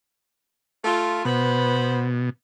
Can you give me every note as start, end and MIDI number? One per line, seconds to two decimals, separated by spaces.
0.84 1.22 57
0.84 1.22 65
1.25 2.30 47
1.25 2.09 59
1.25 2.09 71
1.25 2.09 72